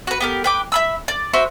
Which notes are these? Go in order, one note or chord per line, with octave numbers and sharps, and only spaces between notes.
F#4 B4
B3 G4 A#4
B4 G5 D6
E5 B5 E6
D5
F#4 B4 C5 E5